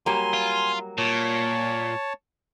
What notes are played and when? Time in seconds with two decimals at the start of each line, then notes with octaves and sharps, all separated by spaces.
0.06 F#3 G3 A#3 G#5 C6
0.33 F4
0.98 A#2 C#5 A5